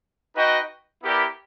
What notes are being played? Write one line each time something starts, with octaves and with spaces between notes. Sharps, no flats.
D#4 F#4 B4 D#5 G5
B3 E4 G4 A#4 D5